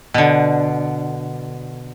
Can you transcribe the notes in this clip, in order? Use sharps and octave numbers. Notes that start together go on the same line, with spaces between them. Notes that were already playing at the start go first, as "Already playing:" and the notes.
B2 D3